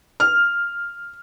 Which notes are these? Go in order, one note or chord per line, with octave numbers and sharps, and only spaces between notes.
F6